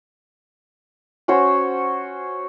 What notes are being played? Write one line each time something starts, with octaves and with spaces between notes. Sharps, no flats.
C#4 F#4 C5 C#5